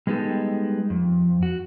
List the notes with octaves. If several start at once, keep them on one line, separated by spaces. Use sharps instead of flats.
G3 G#3 B3 D#4 G4 A4
F2
F#4